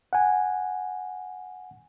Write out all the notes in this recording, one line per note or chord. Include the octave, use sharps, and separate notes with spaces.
F#5 G#5